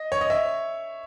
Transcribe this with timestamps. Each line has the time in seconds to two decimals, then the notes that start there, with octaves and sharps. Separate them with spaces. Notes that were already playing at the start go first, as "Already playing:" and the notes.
Already playing: D#5
0.12 C#5
0.21 D#5
0.30 C#5 E5